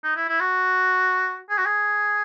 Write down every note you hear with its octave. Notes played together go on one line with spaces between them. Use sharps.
D#4
E4
E4
F#4
G#4
F#4
G#4